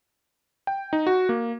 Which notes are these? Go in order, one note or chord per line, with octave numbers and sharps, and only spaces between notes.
G5
D#4
F#4
A#3